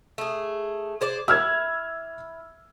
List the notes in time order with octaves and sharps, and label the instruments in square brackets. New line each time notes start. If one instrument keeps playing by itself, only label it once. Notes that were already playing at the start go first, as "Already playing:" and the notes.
[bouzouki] A3 G#4
G#4 C5 D5
[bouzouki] E4 [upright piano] E6 F6 G#6